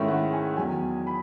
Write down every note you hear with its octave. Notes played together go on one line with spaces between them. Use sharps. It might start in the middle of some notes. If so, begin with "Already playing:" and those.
Already playing: G#2 D#3 A3 C#4 E4 E5
F#5
G#5
E2 D#3 F#3 G#5
B5